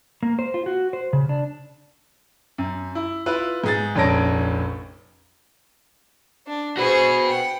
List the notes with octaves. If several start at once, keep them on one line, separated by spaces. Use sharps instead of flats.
A#3
C5
F4
F#4
C5
C#3
D4
F#2
E4
E4 F4 B4
G#2 G#4 A6
F1 A#1 C#4 A5 A#6 D7
D4
F#4 G#4 B4 C5
F#5 G5